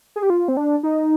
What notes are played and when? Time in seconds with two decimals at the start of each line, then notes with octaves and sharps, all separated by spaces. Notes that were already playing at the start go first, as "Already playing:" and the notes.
0.16 G#4
0.23 G4
0.30 F4
0.48 C4
0.57 D4
0.83 D#4